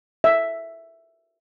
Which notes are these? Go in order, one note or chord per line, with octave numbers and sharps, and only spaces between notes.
E5